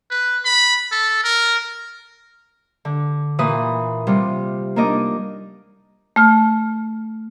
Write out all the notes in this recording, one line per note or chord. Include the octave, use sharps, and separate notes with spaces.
B4
B5
A4
A#4
D3
A#2 E3 B4 D#6
C3 G3 F4
A#3 D4 D#4 D#5 D6
A3 F6